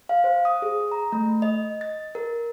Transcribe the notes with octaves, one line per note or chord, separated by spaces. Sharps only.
F5
C5
D#6
G#4
A#5
A3
D#5
A6
A#4